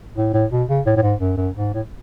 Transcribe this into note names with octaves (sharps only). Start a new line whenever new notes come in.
A2
A2
B2
C#3
A2
A2
G#2
F#2
F#2
G#2
A2